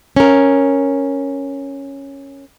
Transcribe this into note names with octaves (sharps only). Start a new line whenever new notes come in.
C#4 A#4